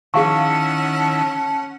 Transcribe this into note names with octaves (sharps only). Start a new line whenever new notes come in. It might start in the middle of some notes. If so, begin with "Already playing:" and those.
D#3 C#4 E4 G#4 F5 F#5 A5 C#6